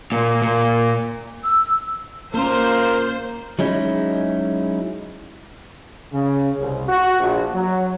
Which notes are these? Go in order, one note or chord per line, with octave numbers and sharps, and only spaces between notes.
A#2
A#2
E6
A#3 C#4 F4 A#4 C5
F#3 G#3 C#4 D#4 E4
C#3
C2
F#4
A#1
F#3